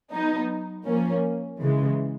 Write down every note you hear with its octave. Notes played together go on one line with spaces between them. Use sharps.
F#3 B3 D#4
F3 A#3 C#4
C#3 E3 G#3